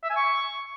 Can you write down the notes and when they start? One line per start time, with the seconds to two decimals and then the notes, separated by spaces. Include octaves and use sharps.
0.03 E5
0.10 G#5
0.16 C#6